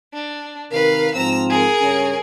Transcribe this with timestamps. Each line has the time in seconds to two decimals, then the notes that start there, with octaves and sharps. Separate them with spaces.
0.14 D4
0.72 C3 D#3 A#4 B4 F5
1.15 G#2 F3 C4 A#5 E6
1.50 G#4 A#4
1.81 G2 C#3 C#4